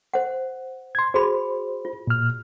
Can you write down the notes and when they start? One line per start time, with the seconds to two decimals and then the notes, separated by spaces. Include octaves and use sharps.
0.14 C5 F#5
0.95 C6 G#6
1.14 F#4 G#4 C5 B5
1.85 F4
2.07 A#2 F6